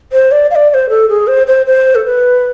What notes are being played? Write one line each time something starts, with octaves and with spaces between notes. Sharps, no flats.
C5
D5
F5
D5
D5
C5
A4
G#4
C5
C5
C5
A4
B4